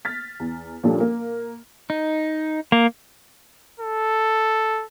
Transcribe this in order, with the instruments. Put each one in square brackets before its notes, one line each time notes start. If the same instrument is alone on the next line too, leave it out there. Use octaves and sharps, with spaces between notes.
[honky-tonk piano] F6 A6 B6
E2
A#2 F3 G3 C#4 D4 A4
A#3
[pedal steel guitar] D#4
[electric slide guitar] A#3 [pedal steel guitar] A#5
[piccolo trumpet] A4